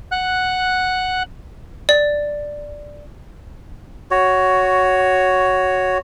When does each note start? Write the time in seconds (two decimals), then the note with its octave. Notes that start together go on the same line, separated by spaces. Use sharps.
0.12 F#5 F#6
1.89 D5
4.11 F#4 C#5